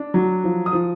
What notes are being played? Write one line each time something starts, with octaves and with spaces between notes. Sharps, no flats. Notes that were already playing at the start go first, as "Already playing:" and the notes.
Already playing: D4
F#3
F3
D#6
F3